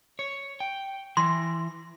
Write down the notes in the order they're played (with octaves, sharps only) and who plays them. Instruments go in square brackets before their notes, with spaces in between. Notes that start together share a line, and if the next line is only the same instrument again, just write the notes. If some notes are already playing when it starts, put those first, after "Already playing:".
[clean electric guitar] C#5
G5
[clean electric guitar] E3 [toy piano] C6